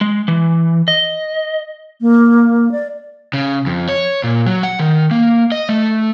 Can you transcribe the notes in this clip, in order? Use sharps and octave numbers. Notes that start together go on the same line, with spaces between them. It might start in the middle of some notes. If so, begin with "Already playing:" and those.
G#3
E3
D#5
A#3
D5
C#3
F2
C#5
A#2
F#3
F#5
D#3
A#3
D#5
A3